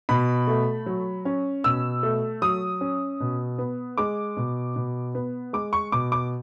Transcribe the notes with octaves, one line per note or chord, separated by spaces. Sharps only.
B2 B5
A3
F#3
C#4
B2 E6
A3
F#3 D#6
C#4
B2
B3
G#3 D6
B2
B2
B3
G#3 D6
C#6
B2 D6
D6